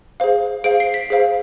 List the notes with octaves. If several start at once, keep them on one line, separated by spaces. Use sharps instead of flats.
G#4 C5 F5
G#4 C5 F5 D7
C7
B6
G#4 C5 F5